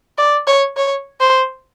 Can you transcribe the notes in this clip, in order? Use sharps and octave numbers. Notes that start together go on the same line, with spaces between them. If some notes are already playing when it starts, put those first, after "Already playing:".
D5
C#5
C#5
C5